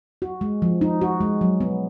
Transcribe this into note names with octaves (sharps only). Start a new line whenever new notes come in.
F#4
G#3
F3
D#4
F#4
G#3
F#3
B3